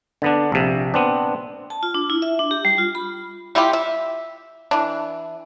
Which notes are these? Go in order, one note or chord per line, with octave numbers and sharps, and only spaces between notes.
D3 B3 D4
A#1 C3
B3 C4 D4
A5
F4
D4
E4
E5
D4
G4
G3
F4
B5
G3 E4 F4 G4
E5
E3 D4